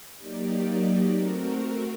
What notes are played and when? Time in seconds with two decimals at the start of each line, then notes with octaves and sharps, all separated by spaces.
0.17 F#3 A#3 D#4 G4 D5
1.01 A3 C4 F#4 A#4